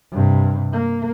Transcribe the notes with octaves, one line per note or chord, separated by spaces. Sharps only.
G2 C3
A#3